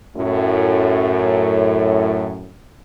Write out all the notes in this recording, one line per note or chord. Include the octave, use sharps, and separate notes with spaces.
F#2 A2